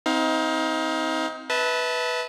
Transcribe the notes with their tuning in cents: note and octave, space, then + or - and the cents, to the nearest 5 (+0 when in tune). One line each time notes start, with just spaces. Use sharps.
C4 -10 D#4 +30 F5 +20
B4 +0 E5 -35 A5 +0